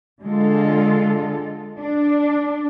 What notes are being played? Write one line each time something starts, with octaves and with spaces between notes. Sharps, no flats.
D3 G#3 F4 A4
D4